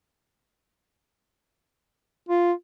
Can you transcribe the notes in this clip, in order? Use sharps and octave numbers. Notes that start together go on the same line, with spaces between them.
F4